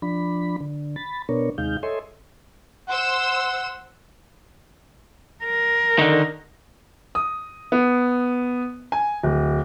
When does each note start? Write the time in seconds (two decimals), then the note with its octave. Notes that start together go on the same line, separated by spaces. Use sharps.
0.02 F3 D4 B5
0.61 D3
0.96 B5 A6
1.29 B2 B3 D4 A#4 C#5
1.58 D#2 C3 G#3 D#4 F5 G6
1.83 A4 C#5 D#5 E5 G#5 C6
2.89 C5 F#5 E6
5.45 A#4
5.99 D3 D#3
7.15 D#6
7.72 B3
8.92 G#5
9.23 D1